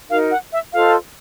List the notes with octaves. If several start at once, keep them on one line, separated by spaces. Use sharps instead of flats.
D#4 F#4 A#4 F5
F#5
E5
F4 A4 C5 D#5 F5